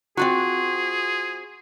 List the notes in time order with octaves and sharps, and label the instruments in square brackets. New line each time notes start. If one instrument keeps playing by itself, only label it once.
[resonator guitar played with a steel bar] C4 F4 F#4 [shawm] G#4